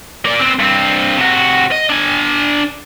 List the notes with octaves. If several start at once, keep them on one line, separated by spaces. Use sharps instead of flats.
A#3 D5
B3 C4
G2 C4
C3 F#4
D#5
D4 G#5